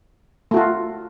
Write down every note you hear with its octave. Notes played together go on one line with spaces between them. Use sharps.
A3 F4 F#4